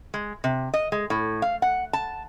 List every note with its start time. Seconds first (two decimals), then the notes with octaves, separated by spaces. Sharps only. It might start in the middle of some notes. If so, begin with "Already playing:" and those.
0.14 G#3
0.44 C3
0.74 D#5
0.92 G#3
1.10 A2
1.42 F5
1.62 F#5
1.93 A5